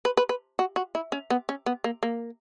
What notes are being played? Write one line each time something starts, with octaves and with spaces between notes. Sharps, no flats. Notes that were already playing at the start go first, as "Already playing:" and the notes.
B4
B4
B4
F#4
F#4
E4
C#4
B3
C#4
B3
A#3
A#3